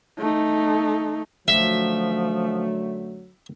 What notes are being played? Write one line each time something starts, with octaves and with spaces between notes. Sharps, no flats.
A3 D#4
F#2 D3 F3 F#3 A3 E5